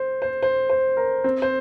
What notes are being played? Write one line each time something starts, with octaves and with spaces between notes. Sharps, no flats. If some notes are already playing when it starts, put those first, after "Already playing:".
Already playing: C5
C5
C5
C5
A#4
C4
C5